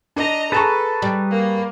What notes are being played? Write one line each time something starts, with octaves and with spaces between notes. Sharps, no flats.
D4 D#5 A#5
G#4 A4 B4 A5 A#5 C#6
G3
A#3